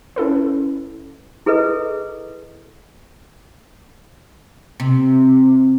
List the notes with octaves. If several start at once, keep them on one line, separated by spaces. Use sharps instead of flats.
C#4 E4 A4 B4
E4 G#4 A4 B4 D#5
C3